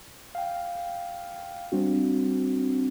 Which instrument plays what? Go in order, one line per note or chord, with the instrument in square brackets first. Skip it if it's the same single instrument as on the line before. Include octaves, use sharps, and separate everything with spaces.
[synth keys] F5 G5
G3 C4 D4 F#4